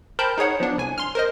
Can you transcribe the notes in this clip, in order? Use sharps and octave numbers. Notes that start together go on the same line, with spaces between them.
A#4 C5 G5 A5 B5 G6
D#4 G#4 C#5 F#5
F3 B3 D4
C2 G#5
C6 F6
A#4 C5 D#5